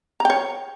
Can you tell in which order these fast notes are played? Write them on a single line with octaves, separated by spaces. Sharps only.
A#5 G5 C#5